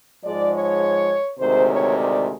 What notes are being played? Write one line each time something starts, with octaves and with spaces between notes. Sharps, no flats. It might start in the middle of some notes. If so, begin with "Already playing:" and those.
G#2 F3 G#3 D5
C#5
D2 C3 D#3 G#3 C5
C#5
D5